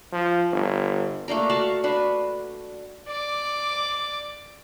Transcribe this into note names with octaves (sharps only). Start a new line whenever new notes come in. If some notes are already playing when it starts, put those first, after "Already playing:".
F3
G1
A3 A#3 D4 A#4
F#4 F5 F#5 A5
D4 F#4 B4
D5 D6